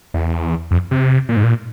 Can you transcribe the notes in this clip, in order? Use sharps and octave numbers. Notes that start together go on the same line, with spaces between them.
E2
F2
C3
A#2
G#2
A#2